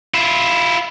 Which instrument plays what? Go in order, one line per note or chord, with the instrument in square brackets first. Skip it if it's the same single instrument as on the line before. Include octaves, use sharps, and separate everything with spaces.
[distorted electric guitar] E4 F4